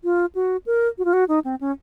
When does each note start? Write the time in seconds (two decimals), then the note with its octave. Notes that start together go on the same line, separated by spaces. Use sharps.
0.04 F4
0.35 F#4
0.66 A#4
0.98 F#4
1.05 F4
1.13 F#4
1.28 D#4
1.44 C4
1.61 C#4